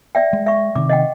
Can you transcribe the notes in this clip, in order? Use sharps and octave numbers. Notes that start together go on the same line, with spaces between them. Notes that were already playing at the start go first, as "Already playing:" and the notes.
D5 E5 G5
G#3
E5 C#6
C3 D#3 D6
D#5 F#5 G5